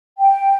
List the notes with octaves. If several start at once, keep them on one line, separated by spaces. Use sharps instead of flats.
G5